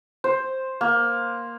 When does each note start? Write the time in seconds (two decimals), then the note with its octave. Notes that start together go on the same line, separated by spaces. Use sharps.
0.24 C5
0.81 A#3